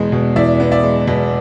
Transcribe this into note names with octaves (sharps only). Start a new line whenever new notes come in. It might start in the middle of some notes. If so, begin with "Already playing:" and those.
Already playing: E2 B2 G#3 B3
B2
E2 D5 E5
B3
D5 E5
G#3
B2